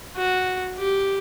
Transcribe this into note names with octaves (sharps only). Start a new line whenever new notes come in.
F#4
G4